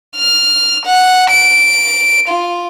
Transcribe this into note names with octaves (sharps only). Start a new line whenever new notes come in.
F6
F#5
D7
F4